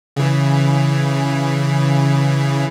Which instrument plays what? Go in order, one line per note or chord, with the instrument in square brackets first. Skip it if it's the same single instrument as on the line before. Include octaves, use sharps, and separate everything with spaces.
[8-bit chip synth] C#3 E3